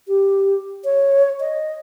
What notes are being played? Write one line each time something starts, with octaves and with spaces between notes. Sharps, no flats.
G4
C#5
D#5